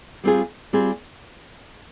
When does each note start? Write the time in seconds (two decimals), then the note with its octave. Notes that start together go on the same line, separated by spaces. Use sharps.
0.24 G3 C4 F4 G#4
0.73 G3 C4 F4 G#4